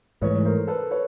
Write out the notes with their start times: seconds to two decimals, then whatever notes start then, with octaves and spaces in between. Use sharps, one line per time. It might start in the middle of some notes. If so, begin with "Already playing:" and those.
0.21 G#2 E3 A3 B4 C#5
0.45 A#4 C5
0.68 A4 B4
0.91 B4 C#5